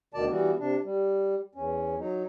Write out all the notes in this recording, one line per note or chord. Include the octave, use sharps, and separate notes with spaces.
D2 B2 D#3 D5 A5
E3 G3 B3 F#4
C3 D4
G3
E2 C#4
F#3 D#4